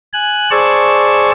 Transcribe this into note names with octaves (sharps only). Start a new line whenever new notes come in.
G#5 F#6
G#4 C5 D5 A5 C#6 E6